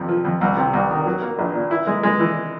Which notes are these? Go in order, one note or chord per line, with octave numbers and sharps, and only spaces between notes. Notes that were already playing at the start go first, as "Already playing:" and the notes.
Already playing: F2 C3
F3
F2
C2
C3
C2
D#3
F#3
A#3
A#1
A#2
E4
G#3
G#3
E3